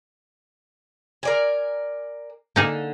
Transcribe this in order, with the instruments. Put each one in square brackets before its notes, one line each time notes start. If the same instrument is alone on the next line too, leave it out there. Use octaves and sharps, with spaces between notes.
[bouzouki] A#4 D5 G#5
[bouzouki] D3 [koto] A#3 D#4 G#4